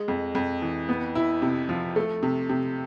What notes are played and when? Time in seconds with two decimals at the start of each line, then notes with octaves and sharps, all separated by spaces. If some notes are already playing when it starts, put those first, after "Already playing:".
Already playing: G#3
0.08 F2
0.35 F2
0.62 E3
0.89 B3
1.15 E4
1.42 C3
1.69 F3
1.96 A3
2.23 C3
2.49 C3